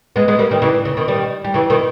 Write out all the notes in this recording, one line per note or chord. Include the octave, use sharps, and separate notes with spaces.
G#3 B3
G#3 B3
G3 A#3
D#3 G3
C#3 E3
C#3
B2 D#3
D#3 G3
G3
C#3 E3
B2 D#3